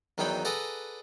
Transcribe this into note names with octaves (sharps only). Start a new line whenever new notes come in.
E2 D#3 F#3 D#4 G5 B5
G#4 A4 B4 D5 F#5 A#5